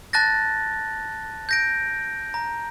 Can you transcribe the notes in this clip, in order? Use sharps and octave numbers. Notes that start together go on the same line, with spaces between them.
A5 F#6 A6 A#6
G6 A#6 D7
A#5